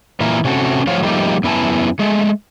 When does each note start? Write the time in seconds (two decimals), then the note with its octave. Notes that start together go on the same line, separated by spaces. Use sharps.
0.20 A#2 E3 E4 A#4
0.44 C3 C#4 F#4 A4
0.87 A2 F3 F#3 C5 C#5 F5
1.03 F3 G3 A3 A#3 D#4 G4
1.43 F#2 B3 E4 G#5 A5
1.99 G#3 A3